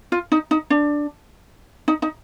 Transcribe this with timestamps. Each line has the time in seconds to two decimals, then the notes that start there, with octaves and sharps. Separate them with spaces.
0.12 F4
0.32 D#4
0.51 D#4
0.70 D4
1.88 D#4
2.02 D#4